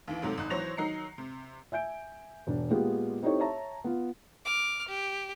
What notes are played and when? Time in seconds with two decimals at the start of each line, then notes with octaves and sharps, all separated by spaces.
0.08 D#2 E3
0.22 G#2 C3 F#3 A3
0.38 G#1 D#4 F#6
0.50 E3 F#3 C5 C#5 A#6 F7
0.77 D#3 F#3 D#4 A#5 C7 C#7
1.18 C3
1.72 E5 G#5 G6 D7
2.47 E1 D4
2.70 A#2 G#3 B3 F4 G4 G#4
3.22 C4 D#4 E4 G4 A4 C#5
3.40 C#5 E5 A5 A#5
3.84 B3 F4
4.45 D6 F6
4.88 G4